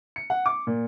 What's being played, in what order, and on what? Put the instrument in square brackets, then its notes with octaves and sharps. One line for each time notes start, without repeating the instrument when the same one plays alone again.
[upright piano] C#7
F#5
D6
A#2